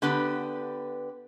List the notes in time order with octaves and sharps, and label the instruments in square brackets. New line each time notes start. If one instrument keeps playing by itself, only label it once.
[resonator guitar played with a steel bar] D3 B3 G4 B4